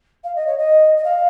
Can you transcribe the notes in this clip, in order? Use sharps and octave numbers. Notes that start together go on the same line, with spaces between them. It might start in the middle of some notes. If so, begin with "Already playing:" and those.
F5
D#5
C#5
D#5
D#5
F5